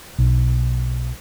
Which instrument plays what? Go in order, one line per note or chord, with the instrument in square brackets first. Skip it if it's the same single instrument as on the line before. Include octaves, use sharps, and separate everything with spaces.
[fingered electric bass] B1